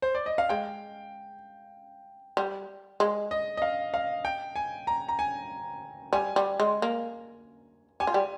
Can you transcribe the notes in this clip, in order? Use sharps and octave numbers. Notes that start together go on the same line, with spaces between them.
C5
D5
D#5
F5
G#3 G5
G3
G#3
D#5
D#5
F5
F5
G5
G#5
A#5
A#5
G#5
G3 G#5
G3
G#3
A#3
G4 G#5
F4
G3 G4